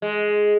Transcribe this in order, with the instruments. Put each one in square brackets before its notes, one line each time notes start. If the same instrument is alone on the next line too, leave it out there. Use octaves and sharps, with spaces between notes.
[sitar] G#3